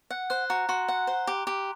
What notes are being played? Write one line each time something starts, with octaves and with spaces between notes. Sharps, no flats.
F#5
C5 F#6
F#4 A#5
F#4 C6
F#5
C5
G4
G4